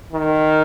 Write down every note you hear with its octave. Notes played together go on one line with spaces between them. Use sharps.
D#3